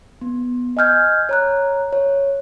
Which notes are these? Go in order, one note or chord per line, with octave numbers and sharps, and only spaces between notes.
B3
D#5 G#5 F6 G6 G#6
C#5 A#5 F#6
C#5